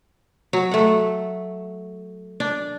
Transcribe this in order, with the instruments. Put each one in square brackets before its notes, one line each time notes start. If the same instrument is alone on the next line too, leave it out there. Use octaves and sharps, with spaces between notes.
[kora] F#3
A3 F#5
D4